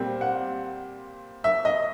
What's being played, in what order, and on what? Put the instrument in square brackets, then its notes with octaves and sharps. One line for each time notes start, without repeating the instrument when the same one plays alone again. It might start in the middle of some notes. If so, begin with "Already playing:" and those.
Already playing: [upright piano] A#2 G3 C4
F#5
E5
D#5